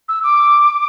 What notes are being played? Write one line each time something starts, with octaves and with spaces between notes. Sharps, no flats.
E6
D6